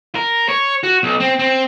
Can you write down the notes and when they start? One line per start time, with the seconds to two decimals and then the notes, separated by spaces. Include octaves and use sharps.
0.15 A#4
0.49 C#5
0.83 F#4
1.03 B1
1.20 C4
1.39 C4